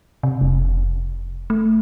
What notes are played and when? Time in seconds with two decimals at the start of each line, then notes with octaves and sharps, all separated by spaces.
0.23 C3
0.41 F1
1.50 A3